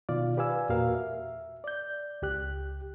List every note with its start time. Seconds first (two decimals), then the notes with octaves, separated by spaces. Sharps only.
0.09 B2 D#3 F4 D5 F5
0.37 G4 B4 D5 F5 G#5 E6
0.69 E2 A#2 F#4 A#4 F5 F6
0.95 E5
1.64 D5 G6
2.22 C#2 G4 F#6